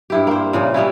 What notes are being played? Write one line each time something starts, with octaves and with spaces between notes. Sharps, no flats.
G2 E4 G4
A#3 C5
A#2 C#3 F3
G3 B3 C#4 E4